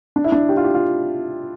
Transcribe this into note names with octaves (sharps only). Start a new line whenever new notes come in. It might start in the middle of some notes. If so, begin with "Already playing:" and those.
D4
E4
D4
G4
F4
G4
F4